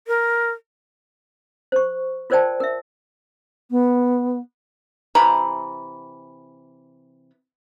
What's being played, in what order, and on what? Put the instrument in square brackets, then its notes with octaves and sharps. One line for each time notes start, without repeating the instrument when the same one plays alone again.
[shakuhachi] A#4
[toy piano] C5 C#6
F4 A#4 C5 D5 G5 A5
A#4 E5
[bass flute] B3
[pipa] C3 E3 A#5 B5